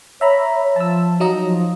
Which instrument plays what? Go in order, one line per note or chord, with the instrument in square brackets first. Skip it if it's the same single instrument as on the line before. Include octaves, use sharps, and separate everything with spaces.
[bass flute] C#5 [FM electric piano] E5 A#5 B5
[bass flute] F3 [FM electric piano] A5 E6
[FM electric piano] F#3 D#4 D#5
[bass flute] F3